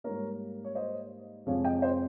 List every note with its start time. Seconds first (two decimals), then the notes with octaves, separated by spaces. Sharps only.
0.04 G#2 G3 A#3 A#4 C#5
0.64 C#5
0.75 C5 D#5
1.46 F2 C3 F3 G#3 C4 C#5 F5
1.64 D#5 G5
1.82 C5 D#5